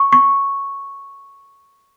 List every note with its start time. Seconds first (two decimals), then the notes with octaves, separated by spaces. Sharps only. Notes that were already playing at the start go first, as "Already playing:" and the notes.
Already playing: C#6
0.13 C#6